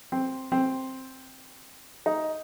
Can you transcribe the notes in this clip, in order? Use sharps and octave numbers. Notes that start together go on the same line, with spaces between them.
C4
C4
D#4